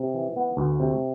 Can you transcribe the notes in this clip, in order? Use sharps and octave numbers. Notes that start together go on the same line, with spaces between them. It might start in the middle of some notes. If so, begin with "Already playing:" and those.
Already playing: C3
E3
B3
D2
C3